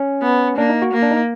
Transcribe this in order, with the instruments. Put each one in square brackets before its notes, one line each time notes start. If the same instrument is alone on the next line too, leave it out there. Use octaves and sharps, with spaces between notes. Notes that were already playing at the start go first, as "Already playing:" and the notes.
Already playing: [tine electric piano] C#4
[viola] B3
[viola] A#3 [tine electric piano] D4
[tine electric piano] D#4
F#4
[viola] A#3
[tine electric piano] D4
D#4